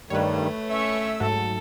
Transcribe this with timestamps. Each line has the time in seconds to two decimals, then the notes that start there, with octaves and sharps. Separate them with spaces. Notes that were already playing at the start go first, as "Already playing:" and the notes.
0.10 G2 D#3 G3 A3 B4 C#5
0.70 C#4 E5 C#6 E6
1.20 G#2 F#3 A4